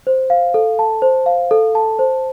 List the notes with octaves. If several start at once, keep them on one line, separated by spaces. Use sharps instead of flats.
C5
F5
A4
A5
C5
F5
A4
A5
C5